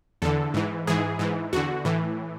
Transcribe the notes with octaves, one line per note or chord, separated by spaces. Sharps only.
E2 D3 A4
G#2 E3
G#2 E3 G#4
G#2 E3
E2 D3 F#4
A2 E3